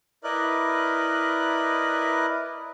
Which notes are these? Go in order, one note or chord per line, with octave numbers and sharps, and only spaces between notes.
E4 A#4 B4 D5 D#5 F#6